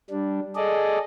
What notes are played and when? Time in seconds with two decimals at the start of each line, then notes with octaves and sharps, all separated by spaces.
0.10 G3 D4
0.56 G#4 A4 D5 D#5